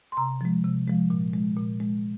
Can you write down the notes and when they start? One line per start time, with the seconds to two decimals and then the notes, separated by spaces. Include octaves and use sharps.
0.12 C6
0.17 C3 A#5
0.41 F3 G#3
0.64 C3
0.87 F3 G#3
1.10 A#2
1.33 G#3
1.57 A#2
1.80 G#3